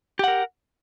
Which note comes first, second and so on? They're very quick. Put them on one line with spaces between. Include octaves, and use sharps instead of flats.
G4 F#5 A#4